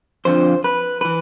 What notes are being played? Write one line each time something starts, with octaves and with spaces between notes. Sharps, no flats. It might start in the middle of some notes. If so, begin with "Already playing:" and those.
F2 D3 F3 C5
B4
E3 B4